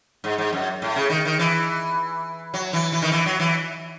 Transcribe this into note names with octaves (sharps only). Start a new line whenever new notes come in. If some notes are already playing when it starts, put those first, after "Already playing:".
G#2
G#2
F#2
A2
C#3
D#3
D#3
E3
F#3
E3
E3
D#3
E3
F#3
E3